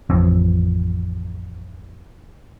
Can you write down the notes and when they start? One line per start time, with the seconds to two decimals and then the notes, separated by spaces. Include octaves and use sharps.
0.10 A1 F2